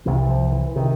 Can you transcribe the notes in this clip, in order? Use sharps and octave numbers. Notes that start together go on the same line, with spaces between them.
C2 C3 E3
F3
E3
C3 D#3